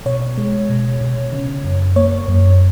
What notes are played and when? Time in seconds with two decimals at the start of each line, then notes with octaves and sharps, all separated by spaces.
0.06 B2 C#5
0.38 G#3
0.69 B2
1.01 B2
1.33 C#3
1.64 F#2
1.96 A#3 C#5
2.28 F#2